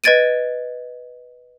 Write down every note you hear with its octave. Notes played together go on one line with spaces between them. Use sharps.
B4 D#5 G#6 A6 D7 D#7